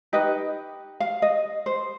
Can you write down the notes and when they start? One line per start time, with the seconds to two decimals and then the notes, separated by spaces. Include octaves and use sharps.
0.13 D#4 G4 B4 D#5
1.00 F5
1.22 D#5
1.66 C5